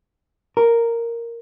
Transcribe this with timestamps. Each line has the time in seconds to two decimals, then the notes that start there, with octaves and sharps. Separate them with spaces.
0.57 A#4